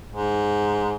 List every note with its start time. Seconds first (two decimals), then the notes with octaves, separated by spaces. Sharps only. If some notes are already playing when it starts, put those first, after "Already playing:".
0.08 G#2